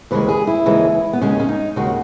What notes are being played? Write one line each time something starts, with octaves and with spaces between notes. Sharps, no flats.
D#2 C#3 E3 G#3 B4
G#4
E4
D#2 C#3 E3 G#3
B3
D#2 C#3 G#3 C#4
C#4
D#4
D#2 C#3 G#3 F#4